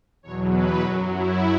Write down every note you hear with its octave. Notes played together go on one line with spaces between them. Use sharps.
E2 B2 F#3 C#5
B4
F#2 F#3 F#4
E4